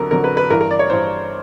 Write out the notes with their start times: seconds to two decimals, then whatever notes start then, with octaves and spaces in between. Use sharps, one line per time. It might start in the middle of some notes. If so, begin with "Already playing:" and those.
Already playing: F2 D3 F#3 A#4
0.11 F2 D3 F#3 A#4
0.24 B4
0.37 B4
0.50 G2 E3 A#4
0.61 A#4
0.71 D5
0.79 C#5
0.90 G2 E3 C5